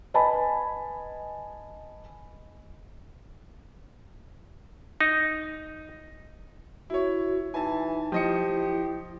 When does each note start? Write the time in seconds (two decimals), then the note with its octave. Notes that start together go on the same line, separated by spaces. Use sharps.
0.14 B4 D#5 G#5 A5 B5
5.01 D#4
6.90 E4 F#4 C#5
7.54 E3 D#4 G#5 A5
8.12 F3 E4 G4 D#5 C#7